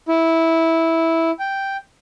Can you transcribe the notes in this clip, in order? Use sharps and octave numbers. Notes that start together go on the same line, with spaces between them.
E4
G5